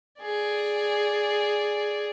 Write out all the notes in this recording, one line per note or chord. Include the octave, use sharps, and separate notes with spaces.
G#4 D5